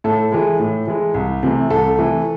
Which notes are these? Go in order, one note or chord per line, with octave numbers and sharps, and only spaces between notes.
A2 A4
E3 G#3
A2
E3 G#3
C2
C3 E3 A3
C2 A4
C3 E3 A3